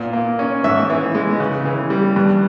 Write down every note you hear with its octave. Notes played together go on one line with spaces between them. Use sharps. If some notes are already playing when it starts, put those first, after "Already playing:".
Already playing: A#2 B3
A#3
C#4
G#2 E5
E3
G#3
C#3
E3
G3
G2